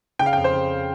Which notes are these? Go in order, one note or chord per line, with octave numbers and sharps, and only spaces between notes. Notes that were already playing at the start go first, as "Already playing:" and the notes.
C#3 G5
F5
F2 G5
C5
C#3